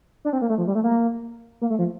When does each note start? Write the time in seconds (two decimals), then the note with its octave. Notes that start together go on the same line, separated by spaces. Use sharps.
0.25 D4
0.33 C4
0.42 A#3
0.49 A3
0.58 F3
0.67 G3
0.75 A3
0.84 A#3
1.61 A#3
1.70 A3
1.79 F3